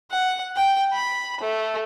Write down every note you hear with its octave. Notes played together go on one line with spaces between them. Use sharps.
F#5
G5
B5
A3